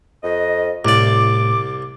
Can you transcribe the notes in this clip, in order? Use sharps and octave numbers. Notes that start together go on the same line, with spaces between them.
F2 D#5
C2 A2 D5 D6